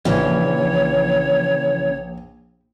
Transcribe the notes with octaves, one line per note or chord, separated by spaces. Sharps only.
A#1 C#3 E3 C#5